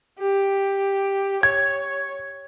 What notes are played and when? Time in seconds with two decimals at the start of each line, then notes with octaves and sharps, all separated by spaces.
0.19 G4
1.43 C#5 G#6